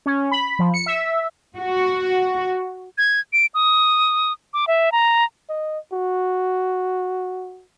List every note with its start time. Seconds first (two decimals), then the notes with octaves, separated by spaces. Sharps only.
0.06 C#4
0.31 B5
0.59 F3
0.74 C#7
0.86 E5
1.57 F#4
2.98 G#6
3.33 D7
3.54 D#6
4.54 D6
4.67 E5
4.92 A#5
5.49 D#5
5.93 F#4